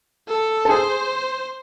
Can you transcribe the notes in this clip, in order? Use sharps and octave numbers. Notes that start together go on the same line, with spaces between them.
A4
A4
G#4 C5